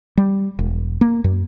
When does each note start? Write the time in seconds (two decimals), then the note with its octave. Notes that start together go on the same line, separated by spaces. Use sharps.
0.17 G3
0.59 E1
1.01 A#3
1.24 F#2